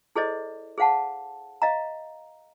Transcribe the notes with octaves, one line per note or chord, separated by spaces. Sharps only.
E4 G#4 A4 C5 D5 D#5
G#4 C5 F5 F#5 A5
D#5 F5 A#5